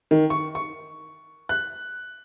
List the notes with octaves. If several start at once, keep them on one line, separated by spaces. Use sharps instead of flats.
D#3
C#6
C#6
F#6